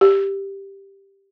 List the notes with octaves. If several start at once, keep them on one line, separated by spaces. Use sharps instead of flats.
G4